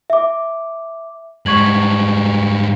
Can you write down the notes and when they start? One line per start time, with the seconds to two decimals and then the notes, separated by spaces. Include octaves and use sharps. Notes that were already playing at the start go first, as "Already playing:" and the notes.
0.10 E5 D6
1.46 G#2 G3 C#6 G#6 F#7